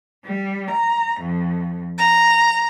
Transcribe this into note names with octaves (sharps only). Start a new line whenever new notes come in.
G3
A#5
F2
A#5